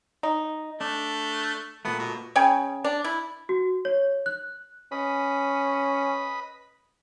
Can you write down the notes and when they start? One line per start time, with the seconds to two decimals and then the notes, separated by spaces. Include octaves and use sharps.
0.23 D#4
0.81 A3 D4
1.85 A#2 A3 B3
1.99 B2
2.36 C#3 C#5 G5 G#5
2.84 D4
3.04 E4
3.49 F#4
3.85 C#5
4.26 F#6
4.92 C#4 B4 D#5 B5